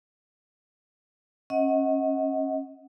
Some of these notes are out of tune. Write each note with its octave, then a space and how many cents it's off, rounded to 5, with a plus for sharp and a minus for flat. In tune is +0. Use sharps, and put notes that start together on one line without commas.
C#4 -25 D#5 +30 F#5 -5